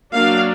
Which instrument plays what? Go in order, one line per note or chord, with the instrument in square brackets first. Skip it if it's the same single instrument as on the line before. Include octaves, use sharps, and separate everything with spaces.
[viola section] F#3 A#3 D4 F5